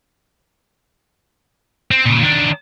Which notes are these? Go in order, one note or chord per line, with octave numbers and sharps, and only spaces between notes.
C4
A#2 C#3
D#3 D4